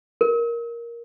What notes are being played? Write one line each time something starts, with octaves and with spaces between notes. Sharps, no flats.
A#4